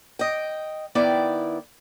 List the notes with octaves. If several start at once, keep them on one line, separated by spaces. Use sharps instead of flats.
D#5 G5
D#3 B3 E4 D5 G5